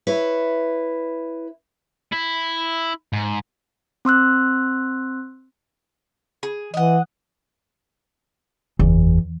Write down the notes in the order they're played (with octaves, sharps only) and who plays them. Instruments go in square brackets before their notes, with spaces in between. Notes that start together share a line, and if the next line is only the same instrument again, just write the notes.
[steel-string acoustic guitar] E4 B4 C#5
[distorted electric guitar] E4
G#2
[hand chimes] C4 C6 E6 F#6
[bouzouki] G#4
[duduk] E3 [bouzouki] D#5 F#5
[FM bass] F#1 [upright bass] E2